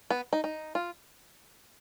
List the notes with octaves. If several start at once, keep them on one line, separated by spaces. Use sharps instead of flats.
B3
D#4
D#4
F4